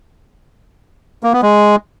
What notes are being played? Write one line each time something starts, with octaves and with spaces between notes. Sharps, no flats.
A#3
B3
G#3